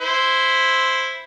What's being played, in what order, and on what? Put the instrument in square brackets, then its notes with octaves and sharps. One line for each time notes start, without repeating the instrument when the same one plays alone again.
[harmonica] E4 C5